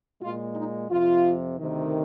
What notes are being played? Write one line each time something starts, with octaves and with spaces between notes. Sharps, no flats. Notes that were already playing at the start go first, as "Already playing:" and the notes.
A#2 G#3 F4
D#4
F2 C3 F3 F4
D2 C3 D#3